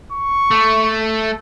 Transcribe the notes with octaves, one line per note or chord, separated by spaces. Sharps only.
C#6
A3